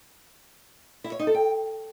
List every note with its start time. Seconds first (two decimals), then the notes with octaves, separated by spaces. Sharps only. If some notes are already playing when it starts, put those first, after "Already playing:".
1.04 E4
1.12 C#5
1.19 D#4
1.27 A4
1.34 G5